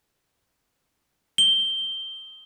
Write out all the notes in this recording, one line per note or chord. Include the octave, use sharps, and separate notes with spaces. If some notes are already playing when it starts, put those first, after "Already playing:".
G7